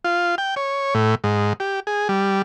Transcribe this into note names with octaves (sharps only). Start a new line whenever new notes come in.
F4
G5
C#5
A2
G#2
G4
G#4
G3